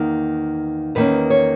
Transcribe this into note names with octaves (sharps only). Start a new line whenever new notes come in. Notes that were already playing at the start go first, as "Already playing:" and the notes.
Already playing: E2 D#3 A#3 D#4
E2 D#3 A#3 C#4 B4
C#5